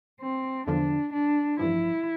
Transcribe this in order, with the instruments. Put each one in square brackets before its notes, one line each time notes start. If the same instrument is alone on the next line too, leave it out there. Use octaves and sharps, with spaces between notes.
[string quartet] C4
[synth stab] E2 D3 F3 [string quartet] D4
[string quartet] D4
[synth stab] A1 G2 F3 [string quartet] E4